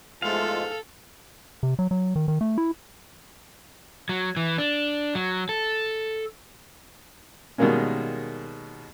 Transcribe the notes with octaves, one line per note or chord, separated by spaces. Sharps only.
E2 G#2 F3 G#3 A3 F4 A4 F5
C3
F#3
F#3
D#3
D#3
A3
E4
F#3
E3
D4
F#3
A4
B2 D#3 G3 G#3 A#3 C#4